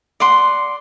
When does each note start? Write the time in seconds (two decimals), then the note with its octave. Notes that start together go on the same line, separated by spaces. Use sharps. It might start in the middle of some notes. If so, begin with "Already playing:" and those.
0.20 D5 F#5 C6